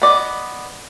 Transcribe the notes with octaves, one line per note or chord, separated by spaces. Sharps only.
B3 D5 D#5